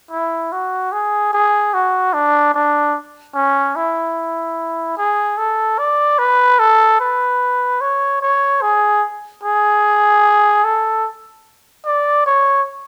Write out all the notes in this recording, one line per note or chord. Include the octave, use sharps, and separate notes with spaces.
E4
F#4
G#4
G#4
F#4
D4
D4
C#4
E4
G#4
A4
D5
B4
A4
B4
C#5
C#5
G#4
G#4
A4
D5
C#5